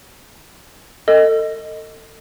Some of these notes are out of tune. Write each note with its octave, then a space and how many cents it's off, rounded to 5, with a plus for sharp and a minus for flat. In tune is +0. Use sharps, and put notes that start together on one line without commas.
A4 +35 D#5 +0